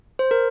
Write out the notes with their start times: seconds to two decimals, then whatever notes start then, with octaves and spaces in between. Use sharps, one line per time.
0.19 C5
0.31 A#4